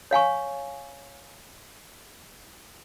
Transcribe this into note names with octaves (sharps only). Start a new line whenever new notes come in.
C#5 F5 G#5 C#6